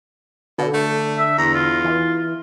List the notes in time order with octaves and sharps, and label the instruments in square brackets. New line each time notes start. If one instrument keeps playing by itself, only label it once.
[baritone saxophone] B2 [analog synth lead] D3
[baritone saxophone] A3
[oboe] E5
[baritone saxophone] E2 [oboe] A#5
[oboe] F4
[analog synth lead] E3